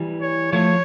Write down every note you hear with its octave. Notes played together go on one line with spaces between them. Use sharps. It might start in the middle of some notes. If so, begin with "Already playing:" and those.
Already playing: E3 G3
C#5
F3 A3 C#5